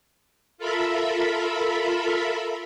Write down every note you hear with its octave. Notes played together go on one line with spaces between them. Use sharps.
F4 A4 A#4 E5 B5